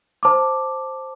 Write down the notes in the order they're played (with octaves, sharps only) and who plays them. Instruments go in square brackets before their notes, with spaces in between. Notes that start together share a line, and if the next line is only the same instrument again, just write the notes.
[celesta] C5 A5 D6